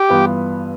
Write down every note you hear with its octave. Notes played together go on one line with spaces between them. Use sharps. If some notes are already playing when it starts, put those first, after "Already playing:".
Already playing: G4
G2 E3 B3 F4